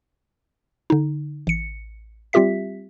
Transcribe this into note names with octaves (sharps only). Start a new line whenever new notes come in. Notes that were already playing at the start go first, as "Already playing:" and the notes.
D3 D#4
A1 C#7
G3 C4 F4 G4 E5 B6